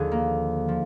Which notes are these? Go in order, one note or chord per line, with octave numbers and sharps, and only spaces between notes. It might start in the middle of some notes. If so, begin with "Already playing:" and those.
Already playing: D#2 D3 F3 G#4
A#3
F3